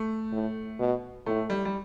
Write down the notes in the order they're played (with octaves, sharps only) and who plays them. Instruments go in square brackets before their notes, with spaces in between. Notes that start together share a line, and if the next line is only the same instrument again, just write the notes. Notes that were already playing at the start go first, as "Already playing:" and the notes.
Already playing: [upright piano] A3
[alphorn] A2
B2
[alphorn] A2 [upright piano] A3
[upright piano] G3
G3